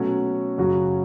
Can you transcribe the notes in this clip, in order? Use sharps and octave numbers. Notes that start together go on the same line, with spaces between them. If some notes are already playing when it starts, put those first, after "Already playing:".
Already playing: B2 F#3 A3 C#4 F#4
F#2 C#3 F#3 C#4 F#4